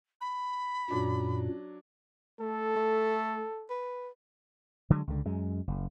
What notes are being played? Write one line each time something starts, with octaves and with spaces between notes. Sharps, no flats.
B5
F#2 A#2 F#3 D4
A3 A4
A3
B4
D3 F#3 G#3
C#2 D3
F#2 G#3
F#1